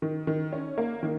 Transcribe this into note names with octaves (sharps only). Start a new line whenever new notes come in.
D#3
D#3
C#4
A#3
D#3